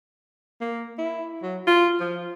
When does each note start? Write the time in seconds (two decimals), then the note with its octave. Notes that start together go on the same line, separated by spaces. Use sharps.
0.61 A#3
0.99 E4
1.43 F#3
1.67 F4
2.00 F3